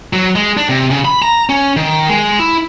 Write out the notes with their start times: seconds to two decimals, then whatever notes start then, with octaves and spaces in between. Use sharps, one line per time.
0.13 F#3
0.36 G#3
0.57 D4
0.69 C3
0.90 C#3
1.05 B5
1.22 A#5
1.49 C#4
1.77 D#3
2.09 G#3
2.40 E4